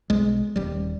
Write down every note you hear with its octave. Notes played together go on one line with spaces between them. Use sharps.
B1 G#3
D#1 G3